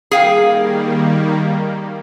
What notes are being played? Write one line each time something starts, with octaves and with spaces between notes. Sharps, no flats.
D#3 G3 A#3 G#4 F5 G5